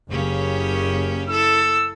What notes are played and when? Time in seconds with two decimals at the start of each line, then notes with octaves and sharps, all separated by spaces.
0.11 F#1 C#3 A#3 C#4 G4
1.29 E4 A4 E6